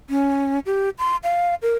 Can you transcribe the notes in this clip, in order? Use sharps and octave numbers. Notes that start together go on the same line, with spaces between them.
C#4
G4
C6
F5
A#4